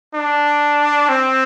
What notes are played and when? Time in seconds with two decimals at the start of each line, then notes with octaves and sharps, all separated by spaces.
0.15 D4
1.09 C4